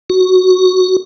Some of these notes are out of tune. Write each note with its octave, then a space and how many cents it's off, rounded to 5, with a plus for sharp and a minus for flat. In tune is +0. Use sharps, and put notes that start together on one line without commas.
F#4 +0